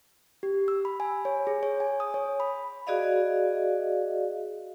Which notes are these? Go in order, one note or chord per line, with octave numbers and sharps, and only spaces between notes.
G4
E6
B5
G#5
C#5
G#4
C#5
G#5
D#6
C#5
B5
F#4 G#4 D5 D#5 F5